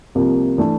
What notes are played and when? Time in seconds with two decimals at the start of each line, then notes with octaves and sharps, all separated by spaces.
0.15 C2 C3 F3 A#3
0.58 E3 A3 D4